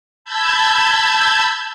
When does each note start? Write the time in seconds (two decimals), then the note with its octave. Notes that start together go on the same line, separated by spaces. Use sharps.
0.25 A5 B5 E6 G6 G#6